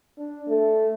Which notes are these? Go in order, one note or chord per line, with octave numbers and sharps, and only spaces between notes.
D4
A3